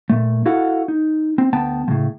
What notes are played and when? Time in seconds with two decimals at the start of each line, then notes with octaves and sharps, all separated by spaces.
0.10 A#2 A3
0.46 E4 F#4 A4 F5 F#5
0.88 D#4
1.38 C4
1.53 D2 B3 G5 A5
1.88 A2 C#3 F3